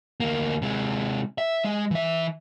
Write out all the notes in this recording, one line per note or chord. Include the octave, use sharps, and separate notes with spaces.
D2 A#3
C3 G#3
E5
G#3
E3 E5